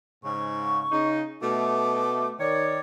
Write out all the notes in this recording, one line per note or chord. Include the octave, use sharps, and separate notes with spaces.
G#2 C#3 C#6
C#3 D#4
B2 A3 D6
D#3 C#5 D5